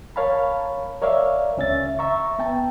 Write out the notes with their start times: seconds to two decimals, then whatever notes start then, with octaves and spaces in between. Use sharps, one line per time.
0.16 A#4 C#5 F5 A5 B5
1.02 A#4 C#5 D5 E5 F5
1.57 C#2 C#4 E5 A6
1.99 E5 A#5 C#6
2.39 B3 G5 A5